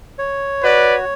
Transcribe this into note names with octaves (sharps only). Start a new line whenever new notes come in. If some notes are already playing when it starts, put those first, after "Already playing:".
C#5
F#4 B4 D5